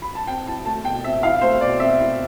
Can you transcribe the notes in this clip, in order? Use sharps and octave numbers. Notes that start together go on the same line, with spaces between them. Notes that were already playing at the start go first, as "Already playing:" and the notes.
B5
A5
C4 G5
E4 A5
A3 A5
B2 G5
C4 E5
E4 F5
A3 C5
B2 D5
C4 E5
E4